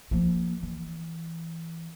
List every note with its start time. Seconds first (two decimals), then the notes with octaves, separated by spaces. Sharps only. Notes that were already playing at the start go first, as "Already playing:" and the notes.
0.11 F3 A#3
0.63 E3